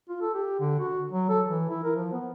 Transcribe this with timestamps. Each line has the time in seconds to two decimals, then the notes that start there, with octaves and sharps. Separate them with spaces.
0.09 F4
0.21 A4
0.34 G4
0.60 D3
0.80 F#4
1.12 F#3
1.29 A4
1.48 E3
1.69 E4
1.84 A#4
1.96 F3
2.12 B3